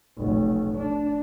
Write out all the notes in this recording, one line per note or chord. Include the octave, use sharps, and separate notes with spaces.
F1 B1
D4